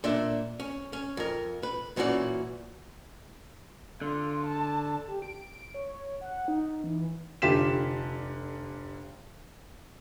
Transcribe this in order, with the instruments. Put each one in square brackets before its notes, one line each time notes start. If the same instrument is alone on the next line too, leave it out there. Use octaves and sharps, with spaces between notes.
[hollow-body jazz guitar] A#2 D4 E5
C#4
C#4
F2 A#4
B4
F#2 A#2 E3 C#4 F#4 D5
[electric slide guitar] D3 [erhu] F4
[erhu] A5
[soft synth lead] G4
D7
C#5
F#5
D#4
E3
[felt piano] F1 D3 F4 G4 B6 E7